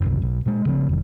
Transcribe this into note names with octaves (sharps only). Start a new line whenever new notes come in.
F#1 C2
B1
A#2 G#3
C#3 F3 C4
F1 D#3